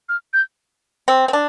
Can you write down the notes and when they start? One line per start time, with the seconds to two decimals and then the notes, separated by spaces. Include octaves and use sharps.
0.09 F6
0.33 G6
1.08 C4
1.28 C4
1.33 D4